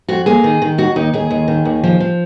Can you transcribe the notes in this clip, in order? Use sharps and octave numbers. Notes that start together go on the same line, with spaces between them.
F2 F#4
A#3 G#4
D#3
D#3
D#2 F#4
D#2 D#4
D#2 G#4
D#2
D#3
D#2
F3
F3